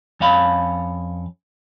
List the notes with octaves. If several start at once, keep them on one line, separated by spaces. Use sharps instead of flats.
F2 C#4 F5 B5